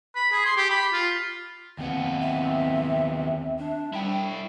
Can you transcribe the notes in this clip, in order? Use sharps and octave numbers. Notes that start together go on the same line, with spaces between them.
B5
G#4
C6
G4
B5
F4
D#2 B3 C4
E5
D4
G3 E4 G5